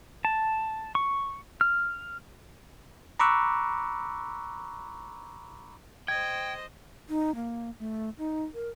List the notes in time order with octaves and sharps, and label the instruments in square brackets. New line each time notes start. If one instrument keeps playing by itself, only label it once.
[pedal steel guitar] A5
C#6
F6
[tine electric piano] A#5 B5 C#6 D6 E6 F#6
[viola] C5 D#5 [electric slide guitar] G5 [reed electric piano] G#6
[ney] D#4
A#3
A3
D#4
A#4